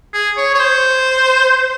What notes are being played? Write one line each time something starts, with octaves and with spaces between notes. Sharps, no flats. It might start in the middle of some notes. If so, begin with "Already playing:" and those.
G#4
C#5
C#5
C5